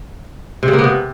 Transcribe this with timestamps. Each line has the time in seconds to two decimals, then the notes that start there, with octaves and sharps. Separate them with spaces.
0.63 C3
0.68 C#3
0.73 A#3
0.79 B3
0.84 C3